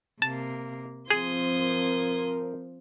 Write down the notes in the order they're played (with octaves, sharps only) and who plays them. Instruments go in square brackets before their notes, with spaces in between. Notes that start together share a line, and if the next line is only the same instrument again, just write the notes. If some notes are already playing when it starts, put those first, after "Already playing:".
[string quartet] C3 A#3 [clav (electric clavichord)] A5
[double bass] F3 C4 [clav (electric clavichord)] G#4 [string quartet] C6 D#6 G#6
[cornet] A#4